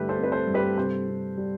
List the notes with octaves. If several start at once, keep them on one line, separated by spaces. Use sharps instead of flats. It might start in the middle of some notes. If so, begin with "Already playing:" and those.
Already playing: G2 D3 A3 E4 G4 B4
A4 C5
C4
B4
A4 C5
G2
G4 B4
C3 A4 C5
C3
G3